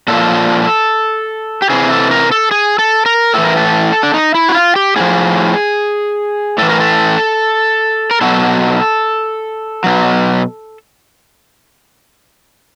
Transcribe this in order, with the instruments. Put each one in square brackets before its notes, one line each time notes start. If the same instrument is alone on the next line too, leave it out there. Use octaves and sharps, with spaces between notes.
[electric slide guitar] A#2 F3 A4
G4
C3 E3 G#4
A4
A#4
A4
G#4
A4
A#4
A2 E3 A4
A#4
A4
D4
D#4
E4
F#4
F4
G4
A2 F3 G#4
A2 E3 A4
A#4
A4
A#4
B2 F#3 A4
B2 F#3